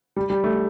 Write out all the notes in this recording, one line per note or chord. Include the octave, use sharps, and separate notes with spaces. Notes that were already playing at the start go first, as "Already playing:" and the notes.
G3
G3
A3